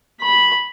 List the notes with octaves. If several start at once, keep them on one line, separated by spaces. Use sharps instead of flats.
B5